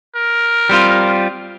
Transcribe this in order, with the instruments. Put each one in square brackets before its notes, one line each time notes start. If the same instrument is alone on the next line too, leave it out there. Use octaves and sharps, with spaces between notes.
[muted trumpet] A#4
[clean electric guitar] G3 C4 F4